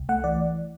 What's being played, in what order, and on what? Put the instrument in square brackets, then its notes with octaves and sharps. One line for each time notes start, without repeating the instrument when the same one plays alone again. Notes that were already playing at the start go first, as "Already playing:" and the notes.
Already playing: [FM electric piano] C2
A3 F#5
E3 D5